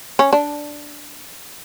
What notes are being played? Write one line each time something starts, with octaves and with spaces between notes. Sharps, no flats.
C#4
D4